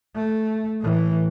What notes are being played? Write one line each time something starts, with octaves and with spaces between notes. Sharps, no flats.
A3
A2 E3